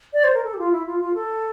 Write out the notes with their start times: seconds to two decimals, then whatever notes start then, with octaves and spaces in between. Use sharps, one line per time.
0.13 D5
0.24 C5
0.34 A#4
0.44 A4
0.54 G4
0.59 F4
0.72 E4
0.86 F4
1.00 F4
1.14 A4